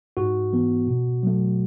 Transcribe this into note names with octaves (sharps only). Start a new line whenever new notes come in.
G#2 F#4
E3 B3
B2
F#3 A3